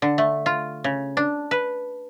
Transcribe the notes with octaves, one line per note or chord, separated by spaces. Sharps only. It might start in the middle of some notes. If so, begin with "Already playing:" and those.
D3
A3
F4
C#3
D4
B4